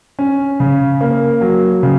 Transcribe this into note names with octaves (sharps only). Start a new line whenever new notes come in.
C#4
C#3
A#3
F#3
C#3